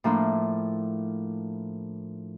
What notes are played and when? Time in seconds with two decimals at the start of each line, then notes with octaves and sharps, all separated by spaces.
0.04 A2 F3 A#3 D4 E4 C6